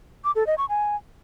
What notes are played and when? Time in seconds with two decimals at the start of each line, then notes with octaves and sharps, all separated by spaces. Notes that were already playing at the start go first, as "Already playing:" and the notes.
0.24 D6
0.35 A4
0.47 D#5
0.58 C#6
0.69 G#5